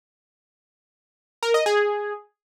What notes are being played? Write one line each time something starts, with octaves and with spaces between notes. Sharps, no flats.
A#4
D#5
G#4